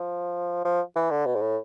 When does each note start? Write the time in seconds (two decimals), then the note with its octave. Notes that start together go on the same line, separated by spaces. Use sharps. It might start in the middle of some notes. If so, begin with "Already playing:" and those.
Already playing: F3
0.65 F3
0.96 E3
1.11 D3
1.26 B2
1.36 G#2
1.41 A2